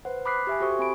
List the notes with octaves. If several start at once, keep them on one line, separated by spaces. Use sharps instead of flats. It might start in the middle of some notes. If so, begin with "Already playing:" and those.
B4 C5 F#5
B5 D6 D#6 F#6 B6 C7
G4 E5 G#5
F#4 G4 A4 C5 C#6 D#6
C4 G#5 B5 D7